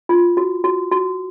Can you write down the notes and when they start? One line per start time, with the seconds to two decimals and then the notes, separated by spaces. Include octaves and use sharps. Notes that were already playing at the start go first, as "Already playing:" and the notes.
0.09 F4
0.37 F#4
0.64 F#4
0.91 F#4